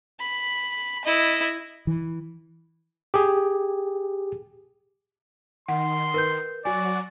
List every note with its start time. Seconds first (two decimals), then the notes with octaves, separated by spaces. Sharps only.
0.20 B5
1.05 E4 D#5
1.87 E3
3.14 G4 G#4
5.68 D#3 F#5 C6
6.14 A#4 B4 G6
6.65 F#3 F#4 D5 G#5